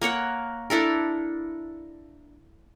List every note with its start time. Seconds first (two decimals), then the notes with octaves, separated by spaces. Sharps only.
0.02 A#3 A#4 C#5 F#5
0.70 D4 E4 A4 A#4